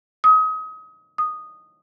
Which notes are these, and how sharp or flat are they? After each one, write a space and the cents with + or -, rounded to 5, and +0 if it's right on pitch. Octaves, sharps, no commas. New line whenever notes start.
D#6 +30
D#6 -10